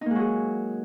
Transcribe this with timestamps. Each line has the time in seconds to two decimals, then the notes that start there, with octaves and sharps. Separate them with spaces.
0.01 D#4
0.06 A#3
0.11 G#3
0.15 F#3
0.20 G#4